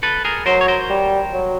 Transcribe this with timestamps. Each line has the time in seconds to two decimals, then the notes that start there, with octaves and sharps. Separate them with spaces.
0.03 A4 B4
0.25 G#4 A#4
0.46 F#3 A#4 C5
0.61 C#5
0.68 A#4 C5
0.90 G3
1.33 F#3